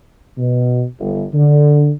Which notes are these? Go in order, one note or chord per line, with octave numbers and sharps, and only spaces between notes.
B2
G1
D3